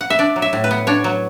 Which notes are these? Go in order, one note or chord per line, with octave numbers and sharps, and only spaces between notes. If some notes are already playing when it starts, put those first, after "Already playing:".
F#5
E5
D4 D5
F#3
E5
A2
B4
B3
D4 C#5
F#3